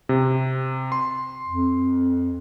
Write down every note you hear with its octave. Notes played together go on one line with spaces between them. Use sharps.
C3
C6
F2